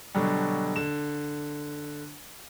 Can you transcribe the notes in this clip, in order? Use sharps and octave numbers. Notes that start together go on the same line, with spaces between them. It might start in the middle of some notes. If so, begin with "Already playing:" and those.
B2 D3 F#3 G3
D3 E7